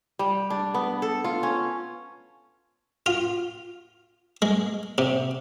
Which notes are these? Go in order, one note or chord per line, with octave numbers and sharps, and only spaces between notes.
G3
D4
B3
A4
F4
C#4
F4
G#3
C3